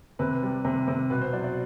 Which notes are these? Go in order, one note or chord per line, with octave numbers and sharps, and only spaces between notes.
C3 B4
G3
C3
C3
B2 B4
C5
F#3 D5
D5